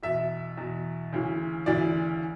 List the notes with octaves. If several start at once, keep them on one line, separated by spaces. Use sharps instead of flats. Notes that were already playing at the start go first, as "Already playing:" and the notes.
E2 B2 E5
E2 B2
D2 C#3 E3
D2 C#3 E3 D5